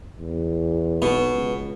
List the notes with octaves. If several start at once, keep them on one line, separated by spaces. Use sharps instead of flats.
E2
B1 B2
C#2